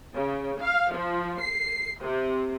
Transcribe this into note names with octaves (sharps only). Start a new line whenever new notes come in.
C#3
F5
F3
C7
C3